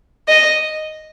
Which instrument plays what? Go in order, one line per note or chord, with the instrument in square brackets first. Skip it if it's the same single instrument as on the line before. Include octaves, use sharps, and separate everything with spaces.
[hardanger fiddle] D#5